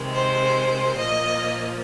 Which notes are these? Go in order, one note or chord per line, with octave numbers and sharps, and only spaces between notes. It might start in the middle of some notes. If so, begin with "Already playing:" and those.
Already playing: C3 D#3 G#3
C5
A#2 F3 A#3 D#5